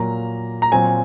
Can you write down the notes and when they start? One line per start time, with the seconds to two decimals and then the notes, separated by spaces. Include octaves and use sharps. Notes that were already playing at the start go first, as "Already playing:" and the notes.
Already playing: A#2 F#3 A#3 A#5
0.62 A#5
0.72 A#2 F#3 C4 G#5